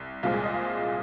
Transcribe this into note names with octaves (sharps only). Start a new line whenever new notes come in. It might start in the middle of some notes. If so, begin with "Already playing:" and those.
Already playing: C2
C2 A#2 F3 G#3 F4
G#4
D#5
F5